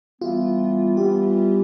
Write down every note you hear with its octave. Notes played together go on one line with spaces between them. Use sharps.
E3 G3 B3 F4
E3 G3 B3 G4